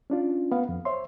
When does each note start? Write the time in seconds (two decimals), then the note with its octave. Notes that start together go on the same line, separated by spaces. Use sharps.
0.10 C#4 D4 F4
0.51 B3 F5
0.69 F2
0.85 C5 C#5 E5 C6